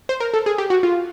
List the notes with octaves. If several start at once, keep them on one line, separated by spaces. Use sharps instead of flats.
C5
A#4
A4
G#4
G4
F#4
F4